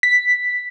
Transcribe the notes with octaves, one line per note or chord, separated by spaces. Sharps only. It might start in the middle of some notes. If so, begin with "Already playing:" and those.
B6